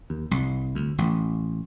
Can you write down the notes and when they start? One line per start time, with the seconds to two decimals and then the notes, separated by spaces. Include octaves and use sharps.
0.10 D#2
0.31 C2
0.75 D2
0.98 A1